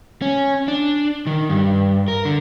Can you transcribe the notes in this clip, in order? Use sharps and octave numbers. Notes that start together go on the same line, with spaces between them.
C#4
D4
D#3
G2
A#4
D3